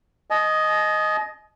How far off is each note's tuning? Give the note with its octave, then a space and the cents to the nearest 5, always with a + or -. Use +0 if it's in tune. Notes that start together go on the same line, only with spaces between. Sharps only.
D#5 +0 G#5 +45